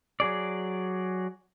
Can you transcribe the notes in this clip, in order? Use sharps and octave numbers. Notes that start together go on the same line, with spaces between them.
F#3 G#4 D5